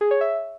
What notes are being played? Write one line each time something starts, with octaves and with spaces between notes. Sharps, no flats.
G#4
C#5
E5